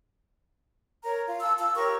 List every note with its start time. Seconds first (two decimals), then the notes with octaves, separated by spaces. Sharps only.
1.04 A#4 C#5 A#5
1.27 F4
1.41 A5 E6
1.59 F4 E6
1.75 G4 A#4 C#5 C#6